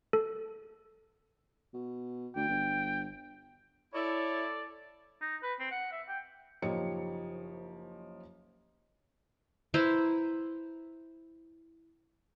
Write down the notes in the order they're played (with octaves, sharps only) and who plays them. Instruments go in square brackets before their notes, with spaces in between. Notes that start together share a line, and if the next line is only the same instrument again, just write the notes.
[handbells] A4
[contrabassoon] B2
[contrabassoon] D2 [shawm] G5
[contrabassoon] G1
[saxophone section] E4 [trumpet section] A4 D5 [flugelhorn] C#5
[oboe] D#4
B4
C4
F#5
E5
G5
[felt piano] F#1 F3 D#4 G4 C#5 C#7
[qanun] E4 B4 C5 A#5